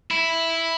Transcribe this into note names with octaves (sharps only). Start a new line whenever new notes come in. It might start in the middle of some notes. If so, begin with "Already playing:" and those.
E4